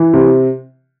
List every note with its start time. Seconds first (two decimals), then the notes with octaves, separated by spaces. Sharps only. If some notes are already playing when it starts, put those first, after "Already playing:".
Already playing: E3
0.13 C3